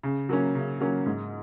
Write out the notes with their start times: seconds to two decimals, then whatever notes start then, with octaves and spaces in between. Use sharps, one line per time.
0.03 C#3
0.29 F#3 A#3 C#4
0.55 C#3
0.80 F#3 A#3 C#4
1.06 G#2